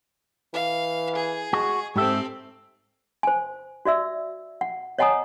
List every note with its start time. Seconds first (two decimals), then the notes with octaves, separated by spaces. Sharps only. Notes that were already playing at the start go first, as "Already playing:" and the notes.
0.53 E3 F5
1.15 G#4
1.53 G#3 F#4
1.96 G#2 C4 G4 A4 E5
3.23 C5 G#5
3.85 F#4 D5 E5 E6
4.61 F#5
4.99 C#5 D#5 F#5 G#5 A#5 D#6